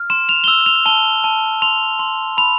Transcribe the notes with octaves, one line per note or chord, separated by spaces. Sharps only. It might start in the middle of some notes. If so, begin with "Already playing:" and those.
Already playing: F6
C6 E7
F7
G7
E6 F7
F7
A5 G7
A5
C6 F7
C6
B5 F7